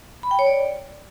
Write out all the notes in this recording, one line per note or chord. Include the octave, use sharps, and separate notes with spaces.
B5
G5
C#5
D5